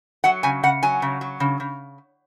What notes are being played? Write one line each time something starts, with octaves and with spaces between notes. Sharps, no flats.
F#3 F#5
C#3 G#5
C#3 F#5
F#3 G#5
C#3
F#3
C#3
C#3